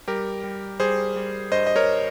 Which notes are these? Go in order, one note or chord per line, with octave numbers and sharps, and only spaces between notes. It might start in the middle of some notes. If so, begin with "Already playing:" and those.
G3 G4 A#4
G3
G3 G#4 C5
G3
G2 C5 D#5
D#5
A#4 C#5